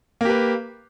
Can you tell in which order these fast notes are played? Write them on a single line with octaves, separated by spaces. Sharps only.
A#3 G4 B4